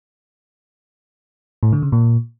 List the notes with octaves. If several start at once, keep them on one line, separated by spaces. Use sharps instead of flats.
A2
D3
C#3
A#2